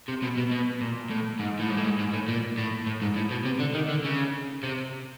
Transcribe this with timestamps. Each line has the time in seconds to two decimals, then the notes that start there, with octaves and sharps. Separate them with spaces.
0.08 C3
0.22 B2
0.37 B2
0.51 B2
0.81 A#2
1.11 A2
1.40 G#2
1.60 A2
1.69 G#2
1.77 A2
1.84 G#2
1.99 G#2
2.13 A2
2.28 A#2
2.58 A2
2.86 A2
3.02 G#2
3.16 A2
3.31 B2
3.46 C3
3.60 D3
3.75 D#3
3.89 D3
4.05 C#3
4.63 C3